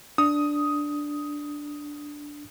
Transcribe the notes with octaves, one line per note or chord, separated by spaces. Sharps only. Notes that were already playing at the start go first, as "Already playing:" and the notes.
D4 D#6